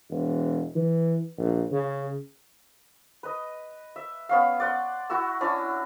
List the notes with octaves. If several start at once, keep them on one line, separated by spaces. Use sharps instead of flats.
E1
E3
A#1
C#3
B4 D#5
E5
B3 C#4 F5
D5 F#5 C6
E4 F#4 C#6 E6
C#4 D4 E4